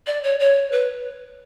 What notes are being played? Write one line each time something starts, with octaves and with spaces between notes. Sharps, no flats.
D5
C#5
C#5
B4